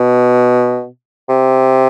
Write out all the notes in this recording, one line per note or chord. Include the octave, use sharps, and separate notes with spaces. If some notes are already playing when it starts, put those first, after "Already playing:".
Already playing: B2
C3